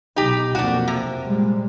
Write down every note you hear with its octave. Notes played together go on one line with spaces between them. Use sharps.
B1 B2 D#4 G4
B1 F2 A#3 D4 F#4
C3
A#2 G3 G#3